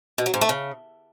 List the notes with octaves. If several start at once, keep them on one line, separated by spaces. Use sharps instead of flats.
B2
F#3
G#2
A3
C#3